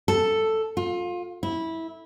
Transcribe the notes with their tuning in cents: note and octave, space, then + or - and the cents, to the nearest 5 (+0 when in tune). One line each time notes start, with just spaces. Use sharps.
A4 +5
F4 +25
E4 -15